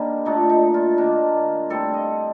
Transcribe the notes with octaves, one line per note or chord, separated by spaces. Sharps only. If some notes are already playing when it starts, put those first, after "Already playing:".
Already playing: D3 G3 A#3 D#4
A#2 A3 D4 D#4
D#4
F4
D#3 A#3 D4
A2 G3 C4 A4
D#5